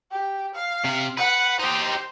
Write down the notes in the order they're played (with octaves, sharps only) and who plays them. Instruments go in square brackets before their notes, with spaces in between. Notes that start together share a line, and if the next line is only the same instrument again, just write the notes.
[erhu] G4
F5
[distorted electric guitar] C3
[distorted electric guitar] B4 [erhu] F#5
[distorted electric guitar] D#4 G4 [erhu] C5